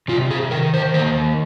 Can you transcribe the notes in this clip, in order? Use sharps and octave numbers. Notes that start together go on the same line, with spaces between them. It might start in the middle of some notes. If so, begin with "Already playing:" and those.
C3 F4
G#4
D#3 A#4
C5
A#3 C5